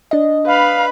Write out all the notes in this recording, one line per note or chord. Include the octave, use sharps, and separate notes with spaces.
D4 D#5
B4 F5 B5